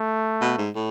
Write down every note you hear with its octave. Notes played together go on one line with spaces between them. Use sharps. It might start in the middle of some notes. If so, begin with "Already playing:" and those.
Already playing: A3
B2
G#2
A2